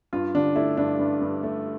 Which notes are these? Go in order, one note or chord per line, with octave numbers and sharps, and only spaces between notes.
G2 F4
D3 D4
A3 E4
G2 D4
G2
G2
A3